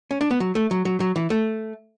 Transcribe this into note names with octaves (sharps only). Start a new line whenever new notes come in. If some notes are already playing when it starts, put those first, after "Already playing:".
C#4
D4
B3
F#3
A3
F#3
F#3
F#3
E3
A3